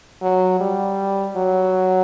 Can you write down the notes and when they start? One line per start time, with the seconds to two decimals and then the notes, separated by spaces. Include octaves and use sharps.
0.22 F#3
0.60 G3
1.36 F#3